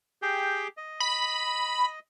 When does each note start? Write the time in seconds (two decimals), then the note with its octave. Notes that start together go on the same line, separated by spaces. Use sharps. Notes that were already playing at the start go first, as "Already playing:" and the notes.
0.22 G4 G#4 G5
0.77 D#5
1.00 B5